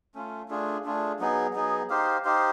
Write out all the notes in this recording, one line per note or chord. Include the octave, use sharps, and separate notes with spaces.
A3 C#4 F4
A3 D4 F4 G#4
A3 D4 F4 G#4
F#3 B3 D#4 G#4
F#3 B3 D#4 G#4
D#4 G4 C5 F5
D#4 G4 C5 F5